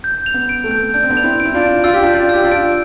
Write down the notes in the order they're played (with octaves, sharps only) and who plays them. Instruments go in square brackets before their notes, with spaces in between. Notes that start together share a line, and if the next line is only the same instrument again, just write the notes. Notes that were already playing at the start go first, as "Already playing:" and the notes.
[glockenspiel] G6
F7
[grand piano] B3
[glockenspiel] D7
[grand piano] A3 C4
[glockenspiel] G6
[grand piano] D4 [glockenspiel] G6
[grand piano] C4
B3 D4
[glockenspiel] F7
[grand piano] C4 E4
[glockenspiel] D7
[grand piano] E4
D4 F4
[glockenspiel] D7
[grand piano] F4 [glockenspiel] E6
[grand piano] G4
D4 F4
[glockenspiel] G6
[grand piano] D4 F4
[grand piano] G4 [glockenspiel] E6
[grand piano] D4 F4
[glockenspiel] D7